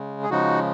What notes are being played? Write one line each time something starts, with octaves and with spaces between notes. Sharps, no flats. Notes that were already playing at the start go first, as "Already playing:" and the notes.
Already playing: C#3 G#3
G#4
C#3 F3 G#3 D#4 F#4